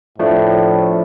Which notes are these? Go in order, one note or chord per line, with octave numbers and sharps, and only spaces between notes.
A2 F3 A3 D4